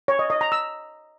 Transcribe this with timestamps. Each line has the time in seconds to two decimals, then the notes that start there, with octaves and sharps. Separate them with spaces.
0.08 C#5
0.19 D#5
0.30 D#5
0.41 A#5
0.52 E6